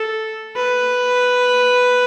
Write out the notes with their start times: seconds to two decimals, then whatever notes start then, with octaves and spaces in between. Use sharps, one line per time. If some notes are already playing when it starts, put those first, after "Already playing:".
Already playing: A4
0.55 B4